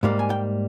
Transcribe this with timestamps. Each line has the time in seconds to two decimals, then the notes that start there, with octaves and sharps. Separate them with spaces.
0.03 G#2 G3 A#3
0.19 G#5
0.30 G5